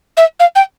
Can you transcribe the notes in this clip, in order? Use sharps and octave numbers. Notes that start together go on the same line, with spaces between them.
E5
F5
G5